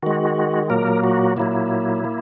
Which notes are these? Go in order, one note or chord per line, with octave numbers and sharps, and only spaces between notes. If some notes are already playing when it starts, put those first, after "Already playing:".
D#3 G#3 F#4
A#2 F#3 A#3 A#4
F#4
A#2 F#3 A#3 E4
A#3